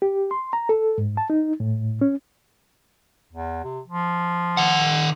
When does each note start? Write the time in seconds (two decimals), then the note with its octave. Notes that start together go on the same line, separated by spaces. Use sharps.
0.02 G4
0.31 C6
0.53 A#5
0.69 A4
0.98 G#2
1.17 A5
1.30 D#4
1.60 A2
2.01 C#4
3.32 E2
3.64 C3
3.86 F3
4.57 D#3 F#5